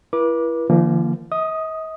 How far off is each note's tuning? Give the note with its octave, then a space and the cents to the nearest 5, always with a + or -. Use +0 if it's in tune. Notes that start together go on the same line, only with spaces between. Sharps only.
E4 +30 B4 -40 D6 +0
D3 +15 F3 -40 A#3 -5
D#5 +40 D#6 +0